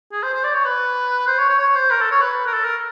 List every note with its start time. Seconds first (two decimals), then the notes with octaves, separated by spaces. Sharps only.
0.12 G#4
0.23 C5
0.34 C5
0.44 D5
0.55 C#5
0.65 B4
1.27 C5
1.38 C#5
1.49 C#5
1.59 C#5
1.75 C5
1.91 A#4
2.02 A4
2.12 C#5
2.21 B4
2.47 A#4
2.53 A4
2.65 A#4